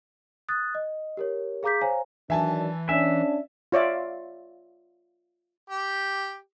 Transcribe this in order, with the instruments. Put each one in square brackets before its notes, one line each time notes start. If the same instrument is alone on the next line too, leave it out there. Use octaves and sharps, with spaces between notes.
[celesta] D#6 F#6 A6
D#5
G4 A#4 C#5
G#4 F5 A#5 D6 G6 B6
C5 C#5 F5 G#5 A#5
[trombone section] D#3 F#3 D4 [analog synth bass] E3 [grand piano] E5 G#5 A5
[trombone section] C#4 D4 [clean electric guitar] E5 [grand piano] G#5
[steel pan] F4 C#5 D5 E5 F5
[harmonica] G4